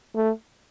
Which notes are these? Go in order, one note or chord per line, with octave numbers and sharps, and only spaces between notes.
A3